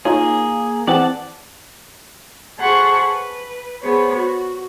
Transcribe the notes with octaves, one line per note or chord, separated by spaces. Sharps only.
A#3 D#4 F4 G#4 C#5
E3 C4 G#4 D5 F#5 A5
G#4 A4 C5 F#5 B5 C#6
B4
B3 G#4 C5 C#5
F#4